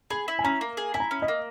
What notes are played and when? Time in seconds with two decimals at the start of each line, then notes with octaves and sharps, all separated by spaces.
0.10 G#4 B5
0.28 E4
0.39 G#5
0.44 C#4 A#5
0.61 A#3
0.77 G#4
0.94 E4 G#5
1.00 A#5
1.11 C#4
1.22 D#5
1.28 A#3